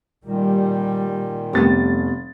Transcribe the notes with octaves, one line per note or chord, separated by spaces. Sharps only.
A#2 D#3 G3
F1 A3 B3 G4 A6